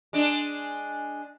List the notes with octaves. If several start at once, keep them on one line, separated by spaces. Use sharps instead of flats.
G#3 D4